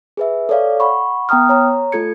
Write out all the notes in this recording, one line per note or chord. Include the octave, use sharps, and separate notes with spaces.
G#4 B4 E5
A4 C#5 D5 F5
F#5 B5 C#6
B3 G5 A#5 D#6 F6
C#5 A#5
A3 F4 A4 G#6 C#7